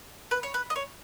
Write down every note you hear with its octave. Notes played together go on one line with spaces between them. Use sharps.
B4
C#5
B4
D#5
C#5